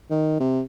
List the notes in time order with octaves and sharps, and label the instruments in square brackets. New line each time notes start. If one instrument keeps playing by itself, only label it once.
[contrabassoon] D#3
C3